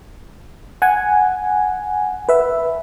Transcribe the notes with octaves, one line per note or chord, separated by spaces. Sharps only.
F#5 G#5
B4 E5